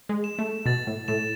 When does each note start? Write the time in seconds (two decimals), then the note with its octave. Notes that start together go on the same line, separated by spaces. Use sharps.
0.09 G#3
0.24 E7
0.39 A3
0.66 B2 A6
0.87 A2
1.08 A2 E7